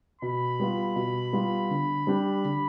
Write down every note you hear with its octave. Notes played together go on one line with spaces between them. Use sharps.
B2 B5
G3 B3 F4
B2
G3 B3 F4
D3
G3 D4 G4
D3